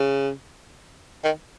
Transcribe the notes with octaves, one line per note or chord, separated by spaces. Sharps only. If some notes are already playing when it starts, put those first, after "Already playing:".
Already playing: C#3
D#3